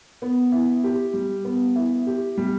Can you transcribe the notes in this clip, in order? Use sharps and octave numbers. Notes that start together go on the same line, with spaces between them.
B3
E4
G4
G3
B3
E4
G4
G3